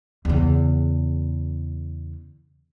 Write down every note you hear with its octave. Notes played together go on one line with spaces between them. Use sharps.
E2 C#3